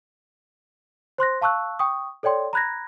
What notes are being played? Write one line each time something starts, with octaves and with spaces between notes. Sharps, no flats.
C5 C6 F#6 A#6
F5 A5 C#6 E6 F#6
G5 C#6 D#6
A4 C#5 D5 G5 C6
A#5 B5 F#6 G#6 A#6